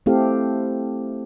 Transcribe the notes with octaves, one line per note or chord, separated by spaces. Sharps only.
A3 C4 E4 G4 A4 F5